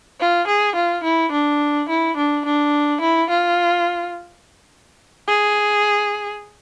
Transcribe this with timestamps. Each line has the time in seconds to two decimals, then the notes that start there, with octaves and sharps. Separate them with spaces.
0.20 F4
0.47 G#4
0.76 F4
1.04 E4
1.32 D4
1.89 E4
2.17 D4
2.45 D4
3.01 E4
3.30 F4
5.28 G#4